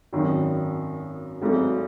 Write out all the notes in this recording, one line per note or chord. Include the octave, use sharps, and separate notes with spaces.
G#1 F#2 D#3
G#1 G#2 F#3 A3